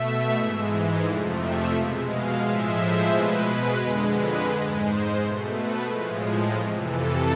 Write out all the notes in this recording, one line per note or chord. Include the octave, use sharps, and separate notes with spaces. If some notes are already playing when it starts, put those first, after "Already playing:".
Already playing: B2 A3 E5
G#2 E3 G#3
F2 C3 F3 A3 D5
E5
B2 G#3
F5
A2 F3 G#3 E5
C5
B2 G#3 B4
B4
F2 D3 G#3
B4
G#2 G#3 C5
C5
B2 A3
B4
A2 F3 G#3
F2 C3 E3
A4